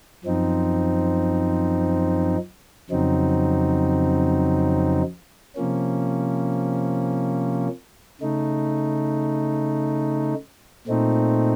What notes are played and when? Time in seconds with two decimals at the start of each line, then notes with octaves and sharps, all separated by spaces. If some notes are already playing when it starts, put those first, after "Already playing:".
0.24 F#2 F3 C4 D#4
2.90 F2 C#3 F#3 C4 D#4
5.56 C3 F3 A#3 C#4
8.22 C#3 A3 D#4
10.87 A#2 A3 C4 D#4